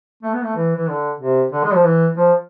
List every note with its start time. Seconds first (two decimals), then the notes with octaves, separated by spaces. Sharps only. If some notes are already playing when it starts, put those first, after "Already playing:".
0.23 A3
0.33 B3
0.43 A3
0.56 E3
0.76 E3
0.88 D3
1.20 C3
1.53 D3
1.64 G#3
1.74 F3
1.85 E3
2.17 F3